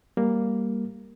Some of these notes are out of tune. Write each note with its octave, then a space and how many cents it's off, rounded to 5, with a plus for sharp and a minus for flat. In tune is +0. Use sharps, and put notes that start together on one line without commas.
G3 +10 A#3 +0